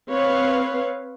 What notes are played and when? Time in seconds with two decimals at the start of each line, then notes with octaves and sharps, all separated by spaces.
0.11 C4 B4 C#5 F5